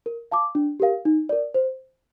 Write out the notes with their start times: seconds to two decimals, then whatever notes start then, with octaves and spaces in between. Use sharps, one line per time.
0.06 A#4
0.32 F5 A5 D6
0.55 D4
0.80 G4 A#4 F5
1.05 D#4
1.29 A#4 D5
1.54 C5